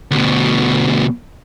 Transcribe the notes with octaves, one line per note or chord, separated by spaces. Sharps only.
D2 B2